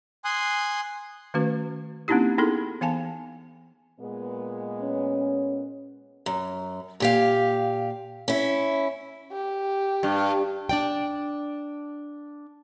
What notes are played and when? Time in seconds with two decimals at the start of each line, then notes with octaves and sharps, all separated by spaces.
0.25 G#5 C6 D#6 F#6
1.34 D#3 A3 C#4 F#4 B4
2.08 A#3 C4 C#4 D#4 E4 G4
2.38 B3 D#4 E4 G#4 A4
2.81 E3 B3 F5 G#5 A5
4.00 A#2 G#3 B3
4.82 C#4
6.26 F#2
7.00 A#2 G4 F5
8.28 C#4 E4
9.32 G4
10.03 G2
10.69 D4 D5 G5